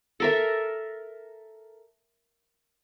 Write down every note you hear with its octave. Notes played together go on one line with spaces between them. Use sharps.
A4 A#4 E5